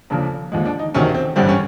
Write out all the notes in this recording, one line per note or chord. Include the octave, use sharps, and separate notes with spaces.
F1 D#2 C#3 F3 D4
D#2 D3 F3 G#3
D4
D#4
E1 D2 C3 D#3 C#4
C4
A1 G2 D3 G3 C4
C#4